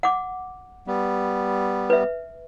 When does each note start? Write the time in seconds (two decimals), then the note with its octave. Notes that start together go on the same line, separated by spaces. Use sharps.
0.03 F#5 D6
0.87 G3 B3
1.90 B4 E5